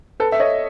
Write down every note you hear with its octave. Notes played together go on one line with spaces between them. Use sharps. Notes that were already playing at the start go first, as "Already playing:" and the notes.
A4 B4
E5
C#5 D#5